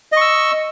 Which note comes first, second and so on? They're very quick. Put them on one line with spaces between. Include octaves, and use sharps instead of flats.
D#5 C#6 E6